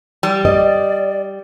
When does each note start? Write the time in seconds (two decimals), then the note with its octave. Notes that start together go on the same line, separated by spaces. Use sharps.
0.23 G3
0.45 D5 D#5